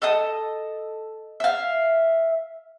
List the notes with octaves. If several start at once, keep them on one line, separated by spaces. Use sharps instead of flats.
A4 D#5 A5 D#6
E5 F5